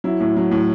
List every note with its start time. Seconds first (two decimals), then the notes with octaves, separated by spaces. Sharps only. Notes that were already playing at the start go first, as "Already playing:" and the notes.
0.04 F#3 E4
0.20 A2
0.37 F#3
0.51 A2